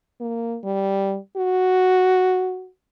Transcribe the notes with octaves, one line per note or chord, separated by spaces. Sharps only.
A#3
G3
F#4